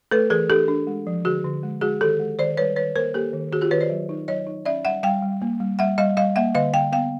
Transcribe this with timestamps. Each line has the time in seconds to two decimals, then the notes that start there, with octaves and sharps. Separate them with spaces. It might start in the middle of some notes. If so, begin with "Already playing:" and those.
0.11 A3 A4 B4
0.30 E3 G#4 A#4
0.50 D4 G4 A4
0.68 D4
0.87 G#3
1.07 F3
1.25 D3 F#4 G#4
1.45 D3
1.63 G#3
1.81 G#3 F#4 G#4
2.01 D#3 G4 A4
2.20 G#3
2.38 D#3 C5 D5
2.57 G3 B4 C#5
2.76 D#3 B4 C#5
2.96 A#3 A#4 C5
3.14 A#3 G4 A4
3.33 D#3
3.52 D#3 F#4 G#4
3.61 F4 G4
3.71 D#3 B4 C#5
3.80 C5 D5
3.90 F#3
4.09 D#4
4.28 F#3 C#5 D#5
4.47 D#4
4.66 C#4 D5 E5
4.85 G3 E5 F#5
5.03 G3 F5 G5
5.22 G3
5.42 A#3
5.60 G3
5.79 G3 E5 F#5
5.98 G3 D#5 F5
6.17 G3 D#5 F5
6.36 A#3 E5 F#5
6.55 D3 D#5 F5
6.74 D3 F5 G5
6.92 B3 F5 G5